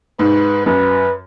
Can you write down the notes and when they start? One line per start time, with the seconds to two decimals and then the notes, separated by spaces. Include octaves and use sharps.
0.19 G#2 B4
0.66 F#2 B4